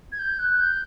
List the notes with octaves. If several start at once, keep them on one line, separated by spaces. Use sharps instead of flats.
G#6
G6
F#6
G6